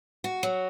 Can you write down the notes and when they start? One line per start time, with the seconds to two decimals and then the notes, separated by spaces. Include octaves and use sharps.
0.24 F#4
0.43 F#3